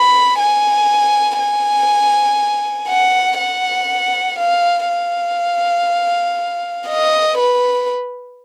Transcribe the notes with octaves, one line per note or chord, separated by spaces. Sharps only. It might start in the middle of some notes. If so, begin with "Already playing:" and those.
Already playing: B5
G#5
G#5
F#5
F#5
F5
F5
D#5
B4